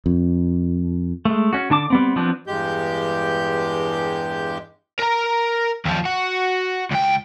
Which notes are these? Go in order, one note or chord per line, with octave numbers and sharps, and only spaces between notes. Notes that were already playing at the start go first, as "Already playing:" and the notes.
F2
G#3 A3
C#4 F#4
D3 D4 A5 D6
G3 B3 C4
F3 B3 C4 D4
E2 G2 G#3 G4 G6
A#4 A#5
D#2 F3
F#4
C#2 G5